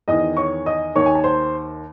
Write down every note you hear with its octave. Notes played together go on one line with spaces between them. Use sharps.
E2 D#3 D#5 D#6
C#5 C#6
D#5 D#6
D#2 D#3 C#5 C#6
G#5
A5
C5 C6